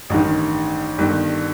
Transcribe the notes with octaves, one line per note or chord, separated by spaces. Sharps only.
A1 G2 D#3
G1 G2 D#3